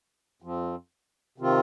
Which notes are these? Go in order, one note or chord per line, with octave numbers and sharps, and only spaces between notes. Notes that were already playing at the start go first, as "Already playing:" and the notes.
F2 F3 C4
C3 D#3 C4 F4